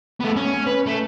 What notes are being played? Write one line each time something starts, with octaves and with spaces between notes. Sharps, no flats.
A3 B3
C#4
B4
A3